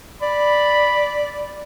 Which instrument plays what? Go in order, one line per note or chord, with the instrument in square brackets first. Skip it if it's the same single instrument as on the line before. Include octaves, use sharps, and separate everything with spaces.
[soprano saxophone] D5 [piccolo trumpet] B5